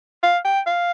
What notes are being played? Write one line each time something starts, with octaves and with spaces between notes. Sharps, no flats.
F5
G5
F5